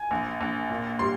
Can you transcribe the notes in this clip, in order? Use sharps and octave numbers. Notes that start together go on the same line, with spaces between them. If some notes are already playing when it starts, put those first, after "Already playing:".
Already playing: G#5
A#1
A#1
A#2
G3 C6